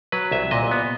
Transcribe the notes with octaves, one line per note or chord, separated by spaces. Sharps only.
F#3 B4
C2 E5
A#2 D#5
B3